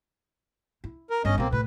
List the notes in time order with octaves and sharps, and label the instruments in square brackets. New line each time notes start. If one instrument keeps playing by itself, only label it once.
[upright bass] E4
[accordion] A#4
[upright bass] G1 D4 [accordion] C#4 D#5
[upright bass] B1 B2 [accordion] A#3 C4
[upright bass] A2 [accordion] B4